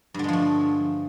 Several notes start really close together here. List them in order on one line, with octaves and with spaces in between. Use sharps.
G2 D3 G#3 F3 A3